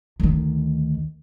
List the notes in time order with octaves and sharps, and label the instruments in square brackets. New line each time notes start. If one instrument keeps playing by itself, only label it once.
[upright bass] D2 D#3